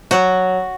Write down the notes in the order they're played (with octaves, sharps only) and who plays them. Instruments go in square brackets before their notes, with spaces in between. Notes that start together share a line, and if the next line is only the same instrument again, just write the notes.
[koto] F#3 F#4